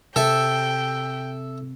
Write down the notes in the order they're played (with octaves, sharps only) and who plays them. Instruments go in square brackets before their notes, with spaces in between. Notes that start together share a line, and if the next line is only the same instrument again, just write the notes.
[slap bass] C3 [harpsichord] A4 E5 [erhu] G5